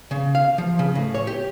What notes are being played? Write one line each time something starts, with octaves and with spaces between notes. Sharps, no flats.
C#3
F5
F3
C#3
A2
C#5
G4